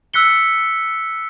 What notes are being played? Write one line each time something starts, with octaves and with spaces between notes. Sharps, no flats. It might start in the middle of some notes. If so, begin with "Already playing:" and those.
E6 F#6 B6 C#7 G7